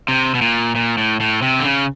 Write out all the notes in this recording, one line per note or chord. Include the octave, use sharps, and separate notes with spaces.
C3
B2
A#2
A#2
A2
A2
C3
D3
C#3